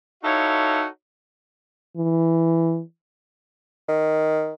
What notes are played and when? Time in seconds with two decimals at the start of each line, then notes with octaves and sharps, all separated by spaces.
0.24 D#4 E4 F#4 A4 C#5 F5
1.97 E3
3.88 D#3